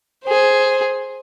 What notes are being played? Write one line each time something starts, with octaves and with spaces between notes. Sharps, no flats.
G#4 C5